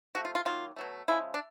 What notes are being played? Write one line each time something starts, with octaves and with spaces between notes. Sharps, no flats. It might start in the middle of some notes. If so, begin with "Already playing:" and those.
C3 F3 A3 F#4
F4
F4
D#3 F#3 A#3 F4
B2 F#3 A3
C#3 F3 G#3 E4
D4